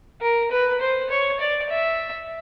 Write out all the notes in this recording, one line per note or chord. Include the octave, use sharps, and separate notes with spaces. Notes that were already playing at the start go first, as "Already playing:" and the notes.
A#4
B4
C5
C#5
D5
E5